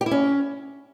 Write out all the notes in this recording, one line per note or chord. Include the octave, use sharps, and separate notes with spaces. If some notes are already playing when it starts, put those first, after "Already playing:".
G4
E4
C#4